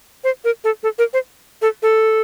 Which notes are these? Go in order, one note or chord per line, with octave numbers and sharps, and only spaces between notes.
C5
A#4
A4
A4
A#4
C5
A4
A4